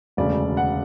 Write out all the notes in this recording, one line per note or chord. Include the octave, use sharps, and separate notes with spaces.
E1 D2 C#3 D5
F#5